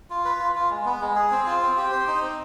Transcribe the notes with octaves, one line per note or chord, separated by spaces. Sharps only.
F4
B4
F4
F4
G#3
B3
G#3
G#4
C4
F4
C4
G4
C5
D#4
C4